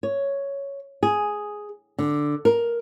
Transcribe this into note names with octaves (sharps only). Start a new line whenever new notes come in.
C#5
G#4
D3
A#4